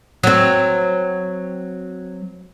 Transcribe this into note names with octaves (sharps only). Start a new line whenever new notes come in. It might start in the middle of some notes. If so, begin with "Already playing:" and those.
F#3 C4